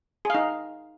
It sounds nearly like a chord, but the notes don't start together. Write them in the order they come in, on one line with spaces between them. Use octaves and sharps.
G#4 F5 D#4